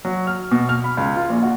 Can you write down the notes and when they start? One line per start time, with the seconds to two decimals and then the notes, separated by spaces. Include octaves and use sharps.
0.05 F#3
0.27 F6
0.51 B2
0.69 F6
0.84 B5
0.97 C#2
1.16 F4
1.29 A#1
1.43 F#4